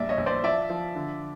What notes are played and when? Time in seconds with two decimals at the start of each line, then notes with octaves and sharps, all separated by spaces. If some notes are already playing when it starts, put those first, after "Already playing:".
Already playing: A#1 G3 D5 E5
0.09 C#5 D#5
0.18 A#1
0.26 C5 D5
0.43 F3 D5 E5
0.70 F3
0.95 D3